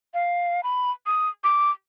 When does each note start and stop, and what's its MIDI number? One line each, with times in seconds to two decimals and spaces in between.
0.14 0.61 77
0.63 0.91 83
1.06 1.29 87
1.44 1.70 86